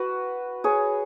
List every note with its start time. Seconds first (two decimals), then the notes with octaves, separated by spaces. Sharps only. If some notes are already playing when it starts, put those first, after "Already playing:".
Already playing: F#4 B4
0.64 G#4 C#5